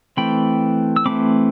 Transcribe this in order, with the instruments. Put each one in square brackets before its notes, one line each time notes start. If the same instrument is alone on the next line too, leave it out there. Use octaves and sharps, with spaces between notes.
[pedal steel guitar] E3 A3 C4 G5 B5
E6
E3 A3 C4 B5 D6